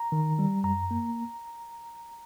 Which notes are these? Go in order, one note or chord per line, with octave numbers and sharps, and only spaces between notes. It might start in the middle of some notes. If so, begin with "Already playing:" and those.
Already playing: A#5
D#3
G3
F#2 A#5
A#3